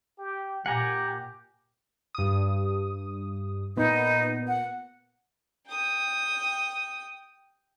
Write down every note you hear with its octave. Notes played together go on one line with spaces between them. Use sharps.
G4
A#2 G4 F#5 G#5 A#5
G2 D#6
A#2 B3 D#4
F#5
G5 D#6